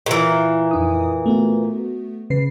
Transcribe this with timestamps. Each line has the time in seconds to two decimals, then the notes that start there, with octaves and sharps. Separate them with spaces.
0.06 A#2 E3
0.71 F2 D#4 D#6
1.26 A3 B3 F#4
2.30 C#3 B4 C7